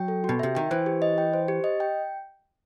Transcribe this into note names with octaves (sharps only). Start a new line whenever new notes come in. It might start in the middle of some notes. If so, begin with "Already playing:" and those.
Already playing: F#3 G5
A4
B2 F#4
C3 E5
D#3 G5
E3 C5
G4
D#5
G5
C5
G4
D#5
G5